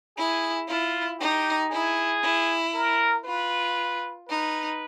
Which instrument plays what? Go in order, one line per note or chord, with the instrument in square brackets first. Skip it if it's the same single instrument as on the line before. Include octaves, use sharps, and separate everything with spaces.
[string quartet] E4 [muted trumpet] G#4
[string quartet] E4 [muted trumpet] F4
[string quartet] D#4 [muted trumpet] G4
[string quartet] E4 [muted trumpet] G#4
[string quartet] E4
[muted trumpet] A#4
[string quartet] F4 [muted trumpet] B4
[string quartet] D#4 [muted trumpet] B4